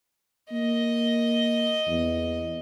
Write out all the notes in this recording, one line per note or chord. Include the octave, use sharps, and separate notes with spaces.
A#3 D#5
E2